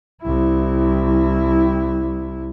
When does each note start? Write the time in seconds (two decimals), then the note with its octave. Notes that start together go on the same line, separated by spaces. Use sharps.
0.22 C2 E4